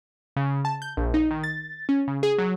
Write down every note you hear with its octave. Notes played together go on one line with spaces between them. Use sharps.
C#3
A5
G6
A#1
D#4
D#3
A6
C#4
C#3
G#4
F#3